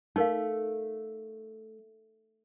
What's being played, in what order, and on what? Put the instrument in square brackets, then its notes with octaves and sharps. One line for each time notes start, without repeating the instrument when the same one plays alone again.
[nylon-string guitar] A3 [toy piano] D#4 A#4 F5